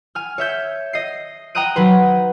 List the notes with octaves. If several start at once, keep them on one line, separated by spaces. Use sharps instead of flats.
G#5 F6
C#5 E5 G6
D#5 C7
D#5 G5 A#5 D#6 F#6 D#7
F#3 D#4 B4 C5